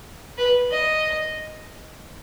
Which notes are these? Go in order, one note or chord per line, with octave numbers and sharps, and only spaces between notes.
B4
D#5